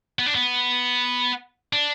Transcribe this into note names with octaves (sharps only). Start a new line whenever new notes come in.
B3
D4
B3
D4